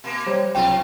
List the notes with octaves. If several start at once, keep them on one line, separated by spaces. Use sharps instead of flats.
B2 A#3
G3 C5 C#5
B1 C3 F4 G5